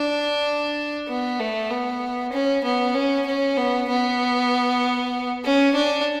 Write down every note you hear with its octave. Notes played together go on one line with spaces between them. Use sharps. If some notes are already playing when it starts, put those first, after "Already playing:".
Already playing: D4
B3
A3
B3
C#4
B3
C#4
C#4
B3
B3
C#4
D4